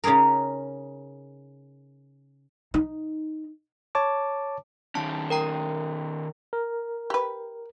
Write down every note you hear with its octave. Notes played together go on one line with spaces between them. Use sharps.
C#3 C#4 D#4 G#4 A#4
D#4
C#5 A5 D6
D#3 C#4 A5
A#4 G5 A#5
A#4
G4 B4